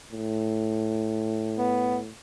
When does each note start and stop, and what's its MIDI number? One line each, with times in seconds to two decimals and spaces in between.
0.12 2.10 45
1.58 1.99 59